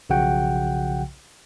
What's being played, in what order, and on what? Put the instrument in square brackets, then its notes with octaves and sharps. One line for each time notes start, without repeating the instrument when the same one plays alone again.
[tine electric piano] B1 C#3 F3 F#4 F#5 G5